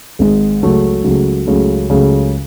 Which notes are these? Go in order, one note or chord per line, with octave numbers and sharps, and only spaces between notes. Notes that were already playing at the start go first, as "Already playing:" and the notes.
G#1 G#2 G#3
C#2 C#3 F#3 A3
C#2 C#3 F#3 A3
C#2 C#3 F#3 A3
C#2 C#3 F#3 A3